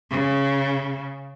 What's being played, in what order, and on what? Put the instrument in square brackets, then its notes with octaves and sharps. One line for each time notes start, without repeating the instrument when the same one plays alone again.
[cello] C#3